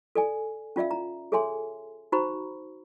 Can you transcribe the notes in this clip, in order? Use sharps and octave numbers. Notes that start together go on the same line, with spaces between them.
A4 D5 G#5
C#4 F4 D5 E5 F5
A#5
G#4 A4 C#5 E5 G#5 C6
D#4 F#4 C5 A#5 B5 C#6